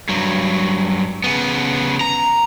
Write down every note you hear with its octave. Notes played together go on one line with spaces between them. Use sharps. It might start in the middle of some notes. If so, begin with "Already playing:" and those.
G2 F#3
C#3 B3
A#5